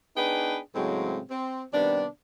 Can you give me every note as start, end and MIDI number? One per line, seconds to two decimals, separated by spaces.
0.17 0.58 59
0.17 0.58 62
0.17 0.58 63
0.17 0.58 68
0.17 0.58 71
0.17 0.58 79
0.75 1.20 45
0.75 1.20 49
0.75 1.20 54
0.75 1.20 56
0.75 1.20 60
1.31 1.64 60
1.73 2.06 48
1.73 2.06 51
1.73 2.06 55
1.73 2.06 59
1.73 2.06 62